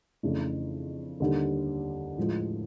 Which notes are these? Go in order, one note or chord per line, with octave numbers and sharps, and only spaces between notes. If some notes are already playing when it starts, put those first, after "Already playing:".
F2 C#3 E3 A3 D4
D#2 D3 G3
A2 F3 G#3